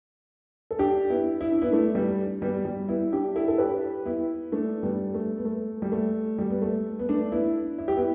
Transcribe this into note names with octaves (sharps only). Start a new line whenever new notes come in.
A4
D4 G4
B3 E4
E4
D4
B3 E4
A3 D4
G3 B3
G3 B3
G3 B3
B3 E4
D4 G4
E4 A4
A4
G4 B4
B3 E4
A3 D4
G3 B3
A3
B3
A3
G3
A3
G3
B3
A3
B3
A3 D4
B3 E4
E4
G4
B3 E4